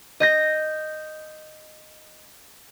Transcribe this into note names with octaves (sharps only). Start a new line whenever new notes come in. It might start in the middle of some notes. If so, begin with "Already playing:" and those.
D#5 G6 A#6